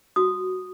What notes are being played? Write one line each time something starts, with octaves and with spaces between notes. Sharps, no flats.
F#4 D#6